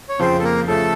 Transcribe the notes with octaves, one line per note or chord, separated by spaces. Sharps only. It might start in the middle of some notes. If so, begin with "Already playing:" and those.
C#5
F2 C#3 F3 C4 C5
A4
A#3 A#4
C#3 F3 A3 A4